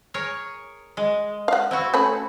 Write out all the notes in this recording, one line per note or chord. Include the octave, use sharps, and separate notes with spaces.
G#4 A#4 C#5
G#3
F5 F#5
C4 E4 F#4
A3 C#4 B5